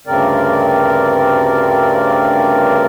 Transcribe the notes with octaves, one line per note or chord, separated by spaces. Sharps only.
D2 G2 C#3 C4 A#4 D5